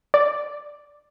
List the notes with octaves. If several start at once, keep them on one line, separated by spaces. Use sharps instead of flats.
D5